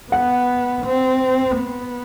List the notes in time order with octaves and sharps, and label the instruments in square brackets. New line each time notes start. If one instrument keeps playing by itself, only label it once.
[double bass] B3 [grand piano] F#5
[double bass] C4
B3